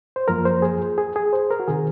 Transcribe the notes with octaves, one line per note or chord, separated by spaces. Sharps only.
C5
F#2 F3 A#3 A#4
C5
G#4
G#4
G#4
C5
A#4
F#4
C3 D#3 G#4